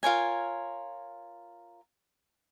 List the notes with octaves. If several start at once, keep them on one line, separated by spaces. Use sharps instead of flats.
F4 A#4 C#5 G#5